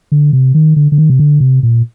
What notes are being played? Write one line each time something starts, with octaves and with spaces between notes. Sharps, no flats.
D3
C3
D#3
D3
D3
D#3
C3
D3
C3
A#2